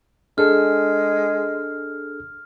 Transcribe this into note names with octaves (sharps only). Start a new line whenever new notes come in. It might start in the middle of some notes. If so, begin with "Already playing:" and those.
G#3 D4 G#4 A4 F6